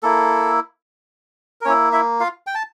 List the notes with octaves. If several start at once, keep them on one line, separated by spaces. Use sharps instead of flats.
A#3 E4 A4
A#4
A#3 C#4 E4 C#5
E4 E5
F4 F5
G5
A5